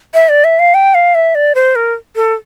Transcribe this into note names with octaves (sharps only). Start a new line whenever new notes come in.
E5
D5
E5
F5
G5
F5
E5
D5
C5
A#4
A4